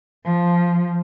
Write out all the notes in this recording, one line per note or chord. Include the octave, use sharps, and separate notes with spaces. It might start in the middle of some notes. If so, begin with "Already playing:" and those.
F3